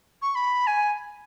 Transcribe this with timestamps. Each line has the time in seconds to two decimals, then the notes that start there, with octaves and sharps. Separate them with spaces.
0.22 C#6
0.35 B5
0.67 G#5